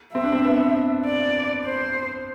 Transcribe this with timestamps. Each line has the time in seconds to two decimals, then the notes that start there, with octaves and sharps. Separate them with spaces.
0.14 C4 E5
0.24 D4
0.32 C4
0.45 B3
1.05 D5
1.65 C5